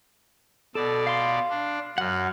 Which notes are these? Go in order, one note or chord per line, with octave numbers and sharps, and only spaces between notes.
B2 A4 D5
F5 C6
D4
F#2 F#5 F6